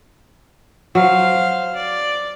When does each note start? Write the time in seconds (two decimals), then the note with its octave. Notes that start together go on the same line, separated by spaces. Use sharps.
0.95 F#3 C5 F5
1.75 D5